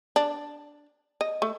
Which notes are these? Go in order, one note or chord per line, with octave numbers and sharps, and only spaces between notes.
D4
D#5
A3